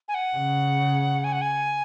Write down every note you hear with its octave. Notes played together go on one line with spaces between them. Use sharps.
G#5
F#5
C#3
G#5
F#5
G#5